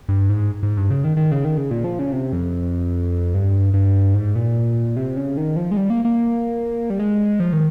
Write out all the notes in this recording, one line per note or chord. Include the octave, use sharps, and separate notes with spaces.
G2
G#2
G#2
G2
C#3
D#3
D#3
C#3
D#3
C#3
A#2
F3
C#3
C3
F2
G2
G2
G#2
A#2
C3
C#3
D#3
F3
G#3
G3
A#3
A#3
G3
G#3
F3
D#3